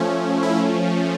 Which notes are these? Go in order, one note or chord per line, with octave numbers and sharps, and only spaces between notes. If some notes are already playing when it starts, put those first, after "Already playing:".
Already playing: F3 A3 C#4
E4